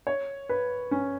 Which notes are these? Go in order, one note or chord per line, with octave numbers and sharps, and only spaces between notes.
C#5
B4
C#4